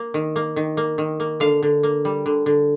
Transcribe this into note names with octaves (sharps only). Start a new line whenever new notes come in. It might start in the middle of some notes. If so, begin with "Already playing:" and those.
Already playing: A#3
D#3
A#3
D#3
A#3
D#3
A#3
D3 F5
D3
A#3
G3
D3
D3